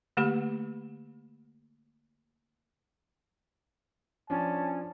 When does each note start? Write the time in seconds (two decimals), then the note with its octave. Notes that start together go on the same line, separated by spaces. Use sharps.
0.17 D3 A3 A#3 G4 F#5 B5
4.30 F3 C#4 D4 A5